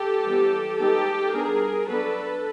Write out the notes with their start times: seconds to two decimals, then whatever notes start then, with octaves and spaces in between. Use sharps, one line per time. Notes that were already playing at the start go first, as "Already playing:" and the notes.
Already playing: G4 A4
0.26 E3 G3 B3
0.79 G#3 B3 D#4 G4 A4
1.33 G3 B3 D4 G#4 A#4
1.87 F#3 B3 D4 A4 B4